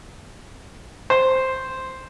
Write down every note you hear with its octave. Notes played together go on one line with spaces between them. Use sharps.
C5